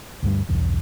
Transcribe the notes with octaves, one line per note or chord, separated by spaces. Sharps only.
D2 G2 F#3 G3
B1 E2 G2